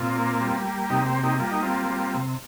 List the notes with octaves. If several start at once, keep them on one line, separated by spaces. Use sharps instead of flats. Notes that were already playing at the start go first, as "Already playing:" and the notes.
Already playing: A#2 C4 F4
A#3
G3
A#3
C3 D#4 G4
G4 C5
A#3
D#4 G4
G3 F4
D#4
A#3 C4 F4
G3
C3